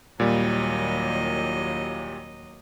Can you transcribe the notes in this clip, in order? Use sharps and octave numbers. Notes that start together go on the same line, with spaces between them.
D#2 A#2 F#3 G3 D#5